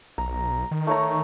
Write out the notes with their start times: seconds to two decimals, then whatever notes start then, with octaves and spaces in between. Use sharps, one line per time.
0.18 B1 A#5
0.71 D#3
0.87 A3 C#5 A#5